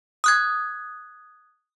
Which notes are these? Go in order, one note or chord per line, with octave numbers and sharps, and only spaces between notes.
D#6 F#6 G#6